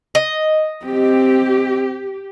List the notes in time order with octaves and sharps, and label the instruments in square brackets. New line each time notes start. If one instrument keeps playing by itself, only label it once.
[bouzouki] D#5
[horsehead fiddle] C4 [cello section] G4